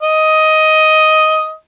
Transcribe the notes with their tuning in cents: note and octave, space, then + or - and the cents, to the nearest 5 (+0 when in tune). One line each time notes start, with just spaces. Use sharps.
D#5 +10